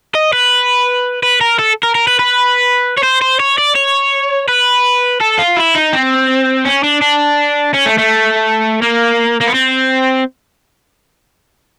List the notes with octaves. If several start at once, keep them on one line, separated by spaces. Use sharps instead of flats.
D#5
B4
B4
A#4
A4
A#4
A#4
B4
B4
C#5
C5
C5
C#5
D5
C#5
B4
A4
F4
E4
D#4
C4
C#4
D4
D4
C#4
A3
A3
A#3
A#3
B3
C4